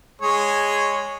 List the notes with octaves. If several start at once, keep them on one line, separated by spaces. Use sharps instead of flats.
G#3 G#4 C#5